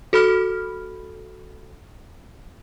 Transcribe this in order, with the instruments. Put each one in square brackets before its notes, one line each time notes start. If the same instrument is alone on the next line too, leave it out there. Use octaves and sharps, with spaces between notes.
[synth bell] F#4 A4 B5 F6